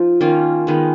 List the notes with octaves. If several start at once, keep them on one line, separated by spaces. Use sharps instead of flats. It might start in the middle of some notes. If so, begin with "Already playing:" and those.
Already playing: F3 D#4
D#3 A#3 C#4 F4
D#3 G#3 B3